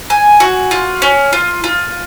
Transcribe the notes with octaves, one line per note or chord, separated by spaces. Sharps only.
G#5
F#4
F4
C#4
F4
F4